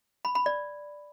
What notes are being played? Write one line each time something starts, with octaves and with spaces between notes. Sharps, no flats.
B5
B5
D5